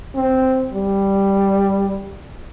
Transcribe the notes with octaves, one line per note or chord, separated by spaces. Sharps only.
C4
G3